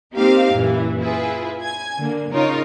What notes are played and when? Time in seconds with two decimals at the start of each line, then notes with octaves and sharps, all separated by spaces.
0.15 A#3 C4 D#4 G4 A#4 F5
0.52 F#2 A#2 E3
1.00 E4 F4 G#4 B4
1.63 G#5 G#6
1.98 D3 A#3
2.32 C#3 D#4 F4 A#4 C#5